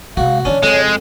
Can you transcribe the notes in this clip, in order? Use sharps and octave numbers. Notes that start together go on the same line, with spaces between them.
C3 G#3 F#4 F5
D3 E3 C#4 D4 C#5
F2 C#3 G#3